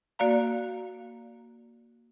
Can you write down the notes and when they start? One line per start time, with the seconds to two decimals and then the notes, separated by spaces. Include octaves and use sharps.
0.19 A#3 F#4 D5 F5 A#5